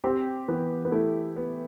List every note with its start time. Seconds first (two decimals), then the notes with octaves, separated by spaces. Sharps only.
0.04 C4 G4
0.48 E3 B3
0.85 B3
0.91 A3 E4
1.36 B3